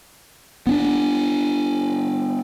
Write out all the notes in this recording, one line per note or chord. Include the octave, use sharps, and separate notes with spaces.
B3 C#4 D4